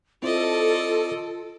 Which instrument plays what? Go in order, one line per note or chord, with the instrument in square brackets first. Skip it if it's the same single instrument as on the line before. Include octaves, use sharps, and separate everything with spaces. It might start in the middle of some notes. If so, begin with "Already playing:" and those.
[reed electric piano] C4 E4 C5 [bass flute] F4 [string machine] A4 [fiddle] D5 D#5